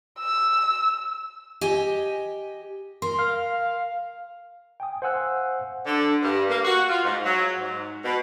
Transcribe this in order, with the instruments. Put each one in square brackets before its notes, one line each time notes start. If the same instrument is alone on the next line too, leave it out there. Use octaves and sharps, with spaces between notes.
[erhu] E6
[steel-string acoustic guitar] G4 D#5 G#5
[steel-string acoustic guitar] A#4 [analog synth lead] C6
[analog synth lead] F5
[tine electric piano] G5 G#5 D#6
C5 F5 F#5 G#5 E6 F#6
[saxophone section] D3
G2
A#3
F#4
F4
G#2
F#3
G#2
B2